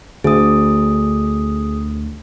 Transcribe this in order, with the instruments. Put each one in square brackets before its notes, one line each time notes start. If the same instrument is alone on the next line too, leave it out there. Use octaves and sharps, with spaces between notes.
[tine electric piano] D2 [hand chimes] G#4 D#6